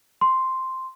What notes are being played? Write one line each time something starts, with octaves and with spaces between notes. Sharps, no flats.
C6